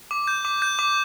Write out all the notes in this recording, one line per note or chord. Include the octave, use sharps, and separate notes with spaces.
D6
G6
D6
G6
D6